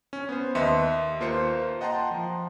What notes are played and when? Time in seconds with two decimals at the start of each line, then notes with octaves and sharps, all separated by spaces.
0.13 C#4
0.29 B3 C5
0.55 D#2 B4 D#5 E5 C6 C#7
1.20 D#2 A#3 F4 C5 C#7
1.81 D#5 F#5 G5 A5 A#5 C6
2.11 F3